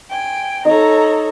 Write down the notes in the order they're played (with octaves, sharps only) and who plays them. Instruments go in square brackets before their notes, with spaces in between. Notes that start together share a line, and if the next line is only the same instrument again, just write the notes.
[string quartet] G5 G#5
[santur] D#4 D#5 [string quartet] A4 C#5 A#5